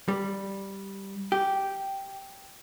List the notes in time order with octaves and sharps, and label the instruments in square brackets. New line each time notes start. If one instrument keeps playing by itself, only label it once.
[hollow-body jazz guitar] G3
G4